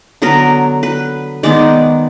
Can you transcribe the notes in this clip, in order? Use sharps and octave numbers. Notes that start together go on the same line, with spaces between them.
D3 F#3 B3 A#4
B4
D#3 G#3 B3 D5